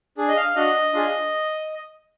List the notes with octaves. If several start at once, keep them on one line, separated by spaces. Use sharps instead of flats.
D4 G#4
D#5
F5
D4 F#4 D#5
D4 F4 G#4